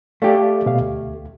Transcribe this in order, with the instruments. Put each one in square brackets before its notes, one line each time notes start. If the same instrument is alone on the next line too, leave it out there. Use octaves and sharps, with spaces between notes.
[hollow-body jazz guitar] A3 G4 [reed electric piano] A4 D5 F5
[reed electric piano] B2 F5
D2